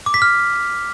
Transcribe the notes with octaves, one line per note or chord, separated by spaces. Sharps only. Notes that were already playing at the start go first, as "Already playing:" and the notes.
D6
B6
F6